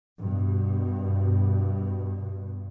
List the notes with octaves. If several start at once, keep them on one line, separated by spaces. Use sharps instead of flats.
G2 B2